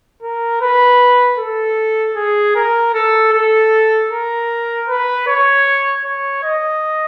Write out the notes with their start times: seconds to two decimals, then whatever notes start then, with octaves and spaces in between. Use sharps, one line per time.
0.22 A#4
0.61 B4
1.39 A4
2.16 G#4
2.55 A#4
2.94 A4
3.33 A4
4.11 A#4
4.88 B4
5.27 C#5
6.05 C#5
6.43 D#5